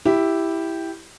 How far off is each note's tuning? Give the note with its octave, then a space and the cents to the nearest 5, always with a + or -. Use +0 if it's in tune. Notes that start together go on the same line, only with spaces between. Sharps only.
E4 +0 G4 +0